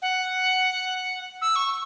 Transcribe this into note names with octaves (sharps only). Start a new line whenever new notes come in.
F#5
E6
C#6